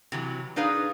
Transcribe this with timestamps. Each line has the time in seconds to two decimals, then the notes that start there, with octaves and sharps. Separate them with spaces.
0.12 C3 E3 F#3
0.56 D4 D#4 G#4 B4 F5